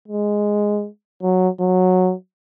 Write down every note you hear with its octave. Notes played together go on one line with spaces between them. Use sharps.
G#3
F#3
F#3